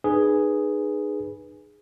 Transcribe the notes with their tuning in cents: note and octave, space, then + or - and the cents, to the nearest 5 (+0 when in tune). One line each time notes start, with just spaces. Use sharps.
D#4 -35 G#4 +0 B4 -10